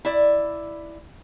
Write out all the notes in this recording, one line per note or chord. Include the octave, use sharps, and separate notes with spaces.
E4 D5